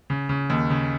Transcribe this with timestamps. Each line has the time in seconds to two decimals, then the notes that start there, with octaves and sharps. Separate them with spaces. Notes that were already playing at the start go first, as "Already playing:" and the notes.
0.10 C#3
0.29 C#3
0.50 D#2
0.70 C#3